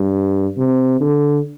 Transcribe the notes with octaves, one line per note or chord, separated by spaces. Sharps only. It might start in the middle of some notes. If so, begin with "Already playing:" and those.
Already playing: G2
C3
D3